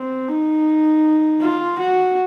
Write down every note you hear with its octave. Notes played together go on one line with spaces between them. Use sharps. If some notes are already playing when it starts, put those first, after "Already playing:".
Already playing: C4
D#4
F4
F#4